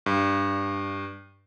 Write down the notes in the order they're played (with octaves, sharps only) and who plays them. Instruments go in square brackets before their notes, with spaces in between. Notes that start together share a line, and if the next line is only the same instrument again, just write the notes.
[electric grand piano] G2